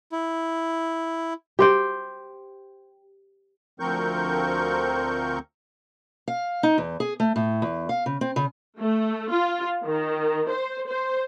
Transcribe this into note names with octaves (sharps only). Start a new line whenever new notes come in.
E4
G4 C5 G5
D2 F3 C4 A#4 C#6 G6
F5
D#4
E2
G#4
A3
A2
E2
F5
C#3
C4
C#3
A3
F4
D#3
C5
C5